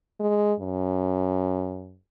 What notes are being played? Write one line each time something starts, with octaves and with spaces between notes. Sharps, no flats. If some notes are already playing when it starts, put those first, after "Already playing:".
G#3
F#2